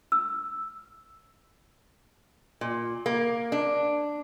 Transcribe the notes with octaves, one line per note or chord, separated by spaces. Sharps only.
E6
A#2
A#3
D4